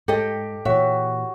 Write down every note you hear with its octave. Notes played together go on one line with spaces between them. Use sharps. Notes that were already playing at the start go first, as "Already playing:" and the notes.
G#2 G4 A4 D#5
A#2 E3 F#4 C#5 E5